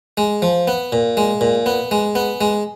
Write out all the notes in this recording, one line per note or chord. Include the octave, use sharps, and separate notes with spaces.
G#3
F3
B3
A#2
G#3
A#2
B3
G#3
B3
G#3